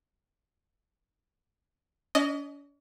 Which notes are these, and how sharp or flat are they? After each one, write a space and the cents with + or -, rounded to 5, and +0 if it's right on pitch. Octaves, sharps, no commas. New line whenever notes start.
C#4 +45 D#5 -10